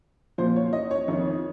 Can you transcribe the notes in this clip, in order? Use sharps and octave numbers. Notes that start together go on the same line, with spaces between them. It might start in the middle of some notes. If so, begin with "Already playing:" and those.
A#2 F3 C5
C#5
D#5
C#5
F2 D#3 C#5